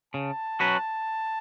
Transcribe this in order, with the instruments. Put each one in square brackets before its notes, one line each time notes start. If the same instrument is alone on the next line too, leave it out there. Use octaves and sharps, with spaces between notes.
[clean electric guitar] C#3 [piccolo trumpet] A5
[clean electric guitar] F#3 C#4 F#4 B4